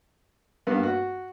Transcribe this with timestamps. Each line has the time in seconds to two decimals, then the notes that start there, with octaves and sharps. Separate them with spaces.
0.67 G2 A#3 B3
0.83 F#4